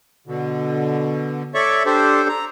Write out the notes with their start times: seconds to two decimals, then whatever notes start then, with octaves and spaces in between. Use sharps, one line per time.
0.27 B2 D3
1.54 A4 C#5 D5 E5 C#6
1.86 D4 G4 A4 C5
2.29 A#5